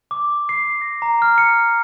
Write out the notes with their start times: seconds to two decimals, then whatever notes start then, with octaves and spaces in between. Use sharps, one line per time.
0.11 D6
0.49 C7
0.81 A#6
1.02 A#5
1.22 F6
1.38 C#7